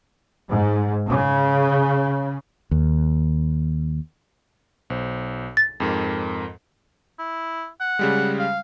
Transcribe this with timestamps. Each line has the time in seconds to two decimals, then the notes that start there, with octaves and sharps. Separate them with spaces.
0.49 G#2
1.10 C#3
2.71 D#2
4.90 B1 C5
5.57 A6
5.80 F2 G#2 A#4
7.19 E4
7.81 F#5
7.99 C#3 G3 G#3
8.39 F5